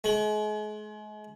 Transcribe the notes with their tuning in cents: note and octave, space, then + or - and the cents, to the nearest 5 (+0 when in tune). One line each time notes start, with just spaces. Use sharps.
G#3 +35